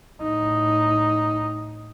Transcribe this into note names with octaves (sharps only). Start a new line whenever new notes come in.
A2 D#4